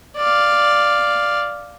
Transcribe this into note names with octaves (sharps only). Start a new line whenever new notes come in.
D5 F5